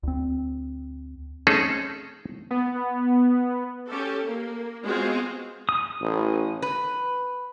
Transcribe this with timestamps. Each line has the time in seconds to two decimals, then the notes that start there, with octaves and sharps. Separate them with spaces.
0.03 D2 C4
1.47 A3 C4 C#4 D#4 G#4 A4
2.51 B3
3.89 C#4 G4 A4
4.25 A#3
4.84 G#3 B3 C4 F4 F#4 G#4
5.69 D#6
6.01 A1
6.62 B4